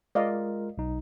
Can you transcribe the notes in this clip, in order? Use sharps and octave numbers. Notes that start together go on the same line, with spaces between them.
G#3 F4 A#4 D5 D#5 F5
B1 D#4